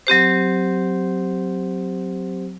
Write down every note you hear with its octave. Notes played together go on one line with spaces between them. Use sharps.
F#3 C4 G4 C5